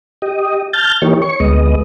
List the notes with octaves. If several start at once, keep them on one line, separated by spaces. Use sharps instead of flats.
G4 D#5
A5 F6 G6 A6
E3 A#3 D#4 G4 C#5
C#5 C#6
D2 G#3 B3 D#5